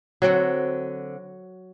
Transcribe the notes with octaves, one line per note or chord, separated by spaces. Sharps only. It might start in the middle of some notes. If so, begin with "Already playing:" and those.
D3 F#3 C4 F#4